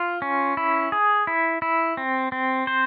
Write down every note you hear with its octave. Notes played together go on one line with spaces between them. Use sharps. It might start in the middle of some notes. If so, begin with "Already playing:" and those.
Already playing: F4
C#4
E4
G#4
E4
E4
C4
C4
C5